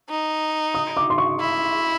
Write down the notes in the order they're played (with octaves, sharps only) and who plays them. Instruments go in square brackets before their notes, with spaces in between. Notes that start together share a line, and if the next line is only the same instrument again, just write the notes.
[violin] D#4
[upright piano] D#6
D6
C6
C#6
[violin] E4